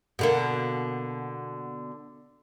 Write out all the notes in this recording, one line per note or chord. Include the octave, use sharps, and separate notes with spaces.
B2 D3 A#3